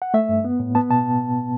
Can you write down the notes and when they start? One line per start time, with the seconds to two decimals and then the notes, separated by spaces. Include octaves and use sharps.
0.02 F#5
0.14 A3 E5
0.29 G2
0.45 B3
0.60 A2
0.75 B3 A5
0.90 B2 A5